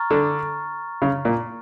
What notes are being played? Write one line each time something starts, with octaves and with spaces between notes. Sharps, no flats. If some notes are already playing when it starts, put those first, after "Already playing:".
Already playing: A#5 C#6 F6 A6
D3
C#3
A#2